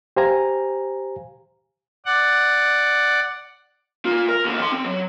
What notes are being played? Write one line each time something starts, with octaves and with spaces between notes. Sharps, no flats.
G4 C5 F5 G#5 A#5
D5 F#5
A#2 F4
A#4
D#2 D3
D#3 C6
C4
F#3